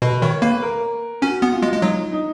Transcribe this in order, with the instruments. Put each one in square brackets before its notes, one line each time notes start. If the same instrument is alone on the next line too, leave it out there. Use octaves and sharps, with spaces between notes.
[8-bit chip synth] B2 [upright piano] B4
[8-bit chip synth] D#3 [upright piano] C#5
[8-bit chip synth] A#3 [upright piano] B4
[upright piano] A#4
[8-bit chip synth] C#4 [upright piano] F#4
[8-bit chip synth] B3
[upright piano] F4
[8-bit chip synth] G#3
G#3
[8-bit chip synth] F#3 [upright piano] D#4
[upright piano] D#4